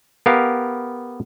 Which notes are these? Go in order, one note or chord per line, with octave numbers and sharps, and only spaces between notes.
B3 G4 A#4 F5